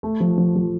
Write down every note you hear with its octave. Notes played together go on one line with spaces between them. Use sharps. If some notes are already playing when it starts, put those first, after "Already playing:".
A3
F3
F3
F3